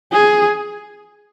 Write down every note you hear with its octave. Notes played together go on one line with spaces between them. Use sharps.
G#4